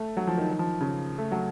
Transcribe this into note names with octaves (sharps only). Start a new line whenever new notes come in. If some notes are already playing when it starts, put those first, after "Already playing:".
Already playing: A3
F#3
F3
D#3
D#3
F3
C#3
A3
F#3